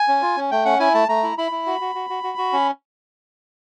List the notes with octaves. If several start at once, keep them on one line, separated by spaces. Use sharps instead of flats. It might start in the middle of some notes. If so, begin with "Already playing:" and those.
Already playing: G#5
C#4
F4
C#4
A3 G5
C#4 F#5
E4 G#5
A3 A5
A3 A#5
E4
E4 B5
E4
F#4
F#4
F#4
F#4
F#4
F#4
C#4